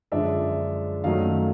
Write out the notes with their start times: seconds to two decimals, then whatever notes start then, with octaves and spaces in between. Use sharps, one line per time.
0.12 F#2 D3 F3 G#3 D5 E5
1.04 F#2 D#3 F#3 A3 D#5 F5